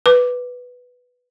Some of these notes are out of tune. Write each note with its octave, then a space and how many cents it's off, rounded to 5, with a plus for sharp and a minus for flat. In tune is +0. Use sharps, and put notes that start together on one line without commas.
B4 +0 D6 +0